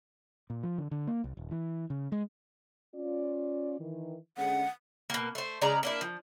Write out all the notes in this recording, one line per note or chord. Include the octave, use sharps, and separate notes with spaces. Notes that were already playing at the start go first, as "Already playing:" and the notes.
A#2
F3
D3
D3
A#3
C2
D#1
E3
C#3
G#3
C#4 F4 D5
D#3 E3
D3 G#3 C#4 F#5
B2 A#3
A3 C5
C#3 G#3 D5 A#5
A#3 D4 E4
F3